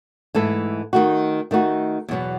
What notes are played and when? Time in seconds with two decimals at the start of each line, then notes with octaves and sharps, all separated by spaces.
0.35 G#2 E3 A3 E4 A4
0.93 D#3 A3 D#4 F#4
1.51 D#3 A3 D#4 F#4
2.09 E2 B2 F#3 B3